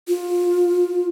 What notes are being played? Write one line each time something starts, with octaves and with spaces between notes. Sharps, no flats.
F4